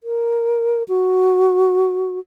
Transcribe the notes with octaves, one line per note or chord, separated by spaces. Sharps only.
A#4
F#4